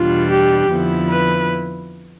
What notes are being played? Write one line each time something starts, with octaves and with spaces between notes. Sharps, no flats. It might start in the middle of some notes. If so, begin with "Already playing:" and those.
Already playing: E2 B2 G3 D4 F4
G4
F2 D3 F3 B3 E4
B4